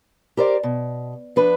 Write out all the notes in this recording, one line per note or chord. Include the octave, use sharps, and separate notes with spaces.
G4 A#4 C5 D5
B2
F3 D4 B4